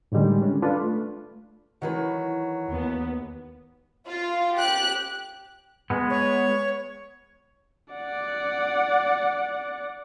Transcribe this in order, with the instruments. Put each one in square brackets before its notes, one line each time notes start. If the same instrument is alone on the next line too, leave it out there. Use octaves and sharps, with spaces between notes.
[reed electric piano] A2 D3 D#3 G3 G#3
C#4 D4
D4 F4 A4 B4
A3
[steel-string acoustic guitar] D#3 E3 B4 [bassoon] F#3
[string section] D#2 B3
[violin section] F4
G4 F#6
[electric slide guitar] G#3 B3
[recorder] C#5
[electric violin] D5 F#5